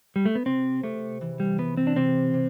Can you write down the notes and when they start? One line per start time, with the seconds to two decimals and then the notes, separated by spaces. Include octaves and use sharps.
0.16 G3
0.25 A3
0.35 B3
0.46 C3 C4
0.83 C3 A3
1.21 E3
1.40 G3
1.58 E3 B3
1.77 C4
1.87 D4
1.96 C3 C4
2.33 C3